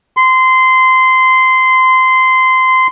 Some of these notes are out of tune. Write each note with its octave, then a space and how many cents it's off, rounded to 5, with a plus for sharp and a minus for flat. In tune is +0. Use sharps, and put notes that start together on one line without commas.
C6 -15